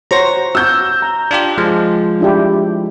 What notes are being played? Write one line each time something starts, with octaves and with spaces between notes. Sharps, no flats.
F#4 C5 C#5 A#5 C#6 A#6
F#4 E6 G6
A#5
D4 F4 G4
F3 G#3
D4 E4 G4